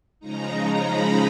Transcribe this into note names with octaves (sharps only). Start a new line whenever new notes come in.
C#3 F3 G#3 D#4 A#5
A#5
B5